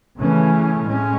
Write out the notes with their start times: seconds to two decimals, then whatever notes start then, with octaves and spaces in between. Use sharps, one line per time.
0.19 C#3 E3 A3 C#4
0.86 A2 G#3 C#4